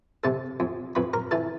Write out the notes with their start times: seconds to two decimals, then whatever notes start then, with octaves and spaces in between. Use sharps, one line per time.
0.24 C3 A4 A5
0.60 F2
0.95 F2 B4 B5
1.14 A#4 A#5
1.31 E3 A4 A5